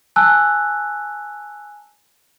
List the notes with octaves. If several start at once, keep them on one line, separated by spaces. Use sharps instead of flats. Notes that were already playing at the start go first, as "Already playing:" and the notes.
G#5 A5 E6 F#6